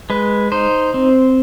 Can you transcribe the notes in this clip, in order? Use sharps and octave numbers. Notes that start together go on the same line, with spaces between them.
G#3 B4
D#4 C5
C4